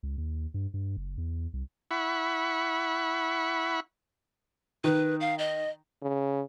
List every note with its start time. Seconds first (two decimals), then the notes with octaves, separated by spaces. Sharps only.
0.03 C#2
0.18 D#2
0.54 G2
0.74 G2
0.97 F#1
1.18 E2
1.53 C2
1.91 E4 F#5 B5 C#6
4.84 D#3 B4
5.20 F5
5.39 D#5
6.02 C#3